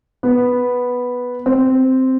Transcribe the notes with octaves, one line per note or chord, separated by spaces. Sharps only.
B3
C4